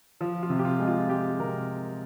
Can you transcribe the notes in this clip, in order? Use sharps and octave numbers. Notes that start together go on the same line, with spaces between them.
F3
F4
C3
G4
F4
G#3
F4
G#3 G4
C3 A#4